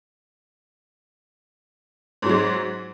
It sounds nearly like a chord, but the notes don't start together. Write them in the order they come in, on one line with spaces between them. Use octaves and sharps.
G#2 F#3 G#3